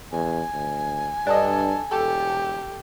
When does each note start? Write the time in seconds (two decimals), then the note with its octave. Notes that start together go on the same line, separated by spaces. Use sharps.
0.12 E2 G#5
0.54 D2
1.27 G2 D4 A4 D#5
1.91 E1 G4 A4